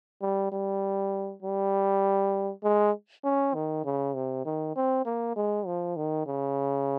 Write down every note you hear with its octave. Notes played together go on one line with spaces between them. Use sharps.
G3
G3
G3
G#3
C#4
D#3
C#3
C3
D#3
C4
A#3
G#3
F3
D#3
C#3